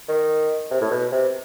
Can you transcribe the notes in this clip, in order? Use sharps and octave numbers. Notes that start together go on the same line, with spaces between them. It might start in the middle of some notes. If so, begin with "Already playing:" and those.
D#3
C3
A2
B2
C3